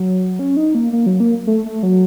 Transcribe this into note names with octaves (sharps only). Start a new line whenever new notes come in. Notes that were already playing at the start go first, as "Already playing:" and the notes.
Already playing: F#3
C#4
D#4
A#3
A#3
F#3
A#3
A3
A3
F#3